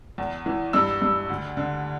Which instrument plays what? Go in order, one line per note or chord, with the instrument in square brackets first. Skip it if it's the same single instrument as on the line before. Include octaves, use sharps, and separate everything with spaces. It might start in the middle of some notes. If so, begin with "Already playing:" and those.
[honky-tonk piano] E2
E3
G2 E6
G2
D2
D3